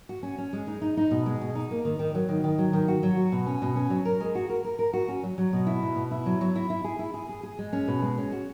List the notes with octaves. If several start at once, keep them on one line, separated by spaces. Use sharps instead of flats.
F#4
C#4
C#4
G#3
D#4
D#4
D#4
B2
G#3
B2
D#4
A#3
D#3
D#3
F#3
D#3
D#3
F#3
D#3
F#4
F#3
F#4
B2
C#4
B2
C#4
F#3
A#4
G#3
F#4
A#4
A#4
A#4
F#4
C#4
F#3
F#3
B2
E4
B2
B2
E4
F#3
F#3
E4
E4
G#4
E4
G#4
G#4
G#4
G#3
C#4
B2
G#3
C#4
F#4